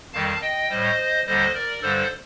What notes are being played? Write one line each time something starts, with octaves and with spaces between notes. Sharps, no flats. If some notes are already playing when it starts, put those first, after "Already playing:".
F2 D#3 G3 F5 A5
D#5 G5
A2 G3 C5 D#5
D#2 D3 G3 C5 D#5
A#4 D5
G2 D3 G3 A4 C5